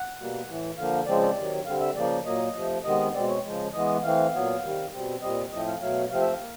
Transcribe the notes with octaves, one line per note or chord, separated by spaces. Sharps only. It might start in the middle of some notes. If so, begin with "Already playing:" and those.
Already playing: F#5
B2 G3 A#3
A2 E3 A3
D3 F3 A#3 F5
C#3 F3 G#3 C4 D5
D5
C3 D#3 F#3
D3 G3 C4 F5
E5
C#3 F3 A#3 D5
A#2 F#3 A#3 D#5
C3 F3 A3
C3 D#3 G#3 B3 D#5
B2 G#3 C4 D5
C#5
C#3 F3 G#3
E3 G#3 B3 D#5
E3 A3 C4 F5
A#2 F#3 B3
C3 D#3 G3
B2 G3 C4
A#2 G3 C4 D#5
A2 F3 A3 C4 D#5
F5
B2 F#3 A3 F5
C3 F3 A3 C4 F5
E5
F5
A#3